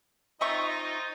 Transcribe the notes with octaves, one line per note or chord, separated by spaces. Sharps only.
C4 D#4 F4 D#5 E5 C#6 A#6